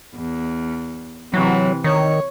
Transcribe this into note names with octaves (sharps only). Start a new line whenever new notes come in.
E2
C3 E3 F#3
D#3 C#5